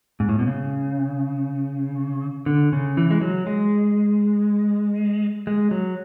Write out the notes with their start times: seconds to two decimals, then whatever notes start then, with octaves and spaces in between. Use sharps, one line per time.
0.20 G#2
0.29 A2
0.39 B2
0.47 C#3
2.46 D3
2.72 C#3
2.97 E3
3.11 G#3
3.21 F#3
3.47 G#3
5.47 G#3
5.71 F#3